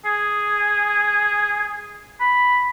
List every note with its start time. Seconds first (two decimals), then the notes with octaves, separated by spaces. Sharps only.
0.05 G#4
2.20 B5